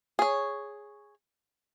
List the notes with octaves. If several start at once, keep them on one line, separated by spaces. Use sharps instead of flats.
G#4 C#5